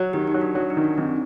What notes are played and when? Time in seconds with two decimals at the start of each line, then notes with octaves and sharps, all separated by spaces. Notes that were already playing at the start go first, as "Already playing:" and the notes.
Already playing: F#3
0.13 D#3 G4
0.27 D#4
0.34 F#3
0.41 D4
0.55 F#3 D4
0.70 D#4
0.77 D#3
0.84 D4
0.98 D#3 C4